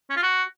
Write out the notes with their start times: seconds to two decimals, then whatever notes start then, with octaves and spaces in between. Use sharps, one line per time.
0.10 C#4
0.17 F4
0.23 F#4